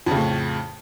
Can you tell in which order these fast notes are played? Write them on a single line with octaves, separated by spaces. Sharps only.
F2 C#3 A2